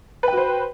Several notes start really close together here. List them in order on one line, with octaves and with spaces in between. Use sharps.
B4 G5 F#4 C5